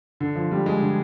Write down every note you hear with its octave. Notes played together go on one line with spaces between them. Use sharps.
D3
F3
G3
G#3 G#4
D3